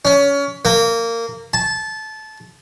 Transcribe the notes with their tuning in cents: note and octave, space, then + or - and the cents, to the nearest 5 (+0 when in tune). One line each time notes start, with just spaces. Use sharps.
C#4 +25
A#3 -20
A5 -20